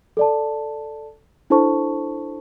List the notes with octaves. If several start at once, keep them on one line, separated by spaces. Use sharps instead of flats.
A4 D5 A5
D4 E4 A4 C5 A5 C#6